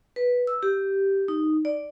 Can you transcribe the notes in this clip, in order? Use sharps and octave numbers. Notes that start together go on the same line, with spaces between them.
B4
E6
G4
D#4
D5